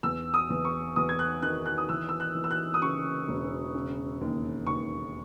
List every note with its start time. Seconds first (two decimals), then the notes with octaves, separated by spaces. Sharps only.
0.03 E2 E6
0.34 D#6
0.50 E2
0.65 C#6
0.96 E2 D#6
1.09 G#6
1.19 F#6
1.42 D#3 F#6
1.66 F#6
1.78 D#6
1.89 E3 E6
2.09 E6
2.20 F#6
2.35 E3
2.44 E6
2.51 F#6
2.74 D#6
2.82 C#3 C#6
3.28 E1
3.75 C#3
4.21 D#2
4.67 D#2 C#6